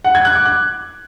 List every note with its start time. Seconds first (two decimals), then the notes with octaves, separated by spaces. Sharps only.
0.05 F#5
0.15 G#6
0.25 F#6
0.35 D6
0.46 F#6